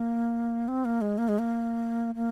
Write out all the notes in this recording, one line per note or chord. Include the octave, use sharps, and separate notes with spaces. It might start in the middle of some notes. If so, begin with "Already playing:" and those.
Already playing: A#3
C4
A#3
G#3
A#3
G#3
A#3
A#3